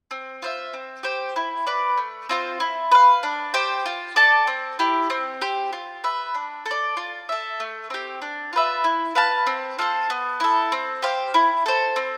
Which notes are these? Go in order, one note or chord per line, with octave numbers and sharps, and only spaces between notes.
C4
F4 C5 E5
C4
G4 C5 G5
E4
B4 D5
A3
C4 F4 C5
E4
B4 F5
D4
G4 C5 G5
F4
A4 D5 A5
C4
E4 G4
C4
G4 C5
F4
B4 E5
D4
A4
D5
F4
A4 E5
A3
C4 G4
D4
F4 B4 E5
E4
B4 F5 A5
C4
F4 A4 C5
B3
E4 A4
C4
G4 C5 F5
E4
A4 C5
C4